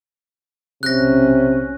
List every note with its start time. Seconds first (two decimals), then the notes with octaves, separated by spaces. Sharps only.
0.83 B1 C3 C#4 F#6 A#6